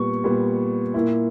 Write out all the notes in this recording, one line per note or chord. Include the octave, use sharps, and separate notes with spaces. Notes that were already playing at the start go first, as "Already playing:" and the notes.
Already playing: A#2 G3 B3 C#6
A#2 G3 B3
A#2 A#3 E4